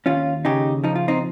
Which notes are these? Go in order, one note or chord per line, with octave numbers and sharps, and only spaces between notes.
D#2 C#4 F4
C#3 D#4 G4
F3 D#4
F4
C4 D#4